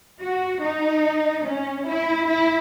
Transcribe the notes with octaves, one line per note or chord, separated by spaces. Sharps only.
F#4
D#4
C#4
E4
E4